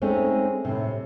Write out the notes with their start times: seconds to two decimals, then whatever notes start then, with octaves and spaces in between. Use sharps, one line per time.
0.02 G#3 A3 C4 C#4 D#4
0.65 A2 C3